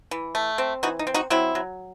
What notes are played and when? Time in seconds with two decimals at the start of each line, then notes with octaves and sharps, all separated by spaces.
0.11 E3
0.35 A3
0.58 C4
0.83 E3 D#4 F#4
0.99 D#4
1.07 C4
1.14 D#4 F#4
1.30 F#3 C4 E4
1.55 F#3